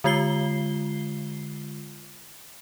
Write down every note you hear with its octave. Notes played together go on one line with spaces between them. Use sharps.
D3 G#3 F4 C7 G7